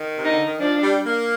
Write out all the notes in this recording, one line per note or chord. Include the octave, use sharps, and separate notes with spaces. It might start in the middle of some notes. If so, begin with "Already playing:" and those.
Already playing: D#3
C3
D#4
D3
D#3
F3 D4
G3
A#3